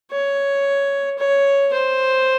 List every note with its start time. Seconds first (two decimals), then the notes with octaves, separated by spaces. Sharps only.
0.11 C#5
1.18 C#5
1.73 C5